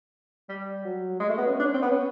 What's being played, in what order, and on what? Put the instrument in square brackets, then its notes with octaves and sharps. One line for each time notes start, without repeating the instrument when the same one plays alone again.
[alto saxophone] G3
F#3
G#3
A3
B3
C#4
D4
C#4
C4
B3
C#4